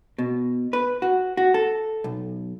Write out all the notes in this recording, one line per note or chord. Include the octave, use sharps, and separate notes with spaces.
B2
B4
F#4
F#4
A4
B1